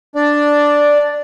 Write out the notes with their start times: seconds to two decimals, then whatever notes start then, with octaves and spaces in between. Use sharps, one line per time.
0.15 D4 D5